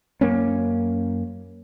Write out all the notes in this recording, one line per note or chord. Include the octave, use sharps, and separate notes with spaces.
F#2 A#3 C#4